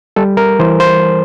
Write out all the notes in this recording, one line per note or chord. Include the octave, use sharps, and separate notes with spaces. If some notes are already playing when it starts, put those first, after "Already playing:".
G3 A4
A#4
E3 C5
C5